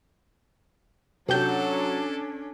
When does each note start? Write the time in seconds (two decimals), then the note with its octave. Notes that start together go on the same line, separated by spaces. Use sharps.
1.29 C3 F#3 C#4 D4 G4 A4 G6